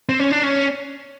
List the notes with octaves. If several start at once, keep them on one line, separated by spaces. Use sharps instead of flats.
C4
C#4
D4
C#4